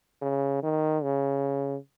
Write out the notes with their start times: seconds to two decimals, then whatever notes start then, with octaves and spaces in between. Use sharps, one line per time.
0.22 C#3
0.63 D#3
1.03 C#3